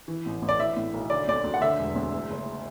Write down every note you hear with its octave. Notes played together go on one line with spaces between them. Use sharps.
E3
A1
A1
D5
E3 E5
A2
B1
D3 D5
D2 D5
D2
F#5
D3 E5
E1
D2
E2
F#1